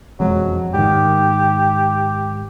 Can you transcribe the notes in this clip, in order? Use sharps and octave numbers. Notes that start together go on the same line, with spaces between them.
E1 F2 F#3 G#3
G#2 D#3 G4